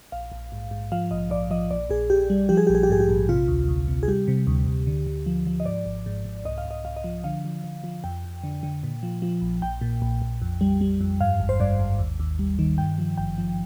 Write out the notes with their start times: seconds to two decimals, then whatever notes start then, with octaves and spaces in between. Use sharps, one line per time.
0.12 A#1 F5
0.32 A#1
0.52 G#2
0.71 G#2
0.92 F3 F5
1.11 A#1 D#5
1.30 A#1 D5
1.50 F3 D#5
1.71 A#1 D5
1.90 A#1 G#4
2.10 A#1 G4
2.30 G3
2.49 F3 G4
2.57 G#4
2.67 A#1 G4
2.75 G#4
2.83 G4
2.89 G#2 G#4
3.00 G4
3.09 A#1
3.29 C3 F4
3.48 D2
3.68 D2
3.87 C3
4.03 G#4
4.08 G3 G4
4.28 C3
4.47 D2
4.67 D2
4.87 D3
5.07 D3
5.26 F3
5.47 F3
5.60 D#5
5.66 G#2 D5
5.85 G#1
6.06 G#2
6.25 G#2
6.45 C2 D#5
6.58 F5
6.65 C2
6.71 D#5
6.85 C2 F5
6.96 D#5
7.04 F3
7.24 D3 F5
7.45 F3
7.64 D3
7.84 F3
8.04 F2 G5
8.24 F2
8.44 D3
8.63 D3
8.83 A#2
9.03 F3
9.22 F3
9.41 A#1
9.62 A#1 G5
9.81 A#2
10.02 A#1
10.22 A#1
10.42 F2
10.61 G3
10.81 G3
11.01 F2
11.21 G2 F5
11.40 G#1
11.49 C5
11.60 G2 D5
11.80 G#1
11.99 D#2
12.20 D#2
12.39 G3
12.59 D#3
12.78 G2 G5
12.98 F3
13.18 G#1 G5
13.38 F3